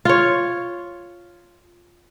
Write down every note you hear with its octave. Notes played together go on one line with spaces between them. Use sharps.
F4 C#5